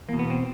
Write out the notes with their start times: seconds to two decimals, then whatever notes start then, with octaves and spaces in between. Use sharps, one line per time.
0.08 E2 A#3
0.13 B2
0.19 B3
0.30 C4